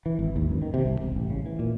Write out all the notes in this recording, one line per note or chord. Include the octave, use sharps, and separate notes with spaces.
E3
G#1
D#2
F#2
D#3
C3
C2
E1
A1
C#3
E3
A#2